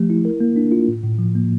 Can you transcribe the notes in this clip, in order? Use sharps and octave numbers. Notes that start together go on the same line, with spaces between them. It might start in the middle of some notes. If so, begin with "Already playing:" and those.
Already playing: F3 A3 G4
E4
A#4
A#3
D4
F4
A2
A2
F3
A#3